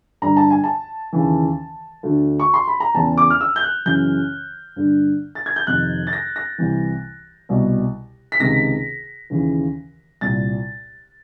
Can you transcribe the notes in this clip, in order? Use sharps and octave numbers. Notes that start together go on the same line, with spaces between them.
G2 D3 A#5
A5
G#5
A5
D#2 C#3 E3
D2 D3
C#6
C6
B5
A#5
E2 C#3 E3 A5
D6
F6
E6
G6
F#6
F#2 C#3 E3 G6
G2 D3
A6
G#6
G6
F2 C3 D#3 F#6
A6
A#6
A#6
C2 C3 E3
C2 B2
B6
C#2 C3 D#3 A#6
D#2 C#3 E3
C2 A#2 A6